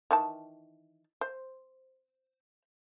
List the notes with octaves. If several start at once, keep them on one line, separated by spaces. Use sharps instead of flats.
D#3 E3 A5
C5